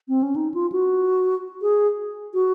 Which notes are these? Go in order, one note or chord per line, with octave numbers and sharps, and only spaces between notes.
C4
C#4
D#4
F4
F#4
G#4
F#4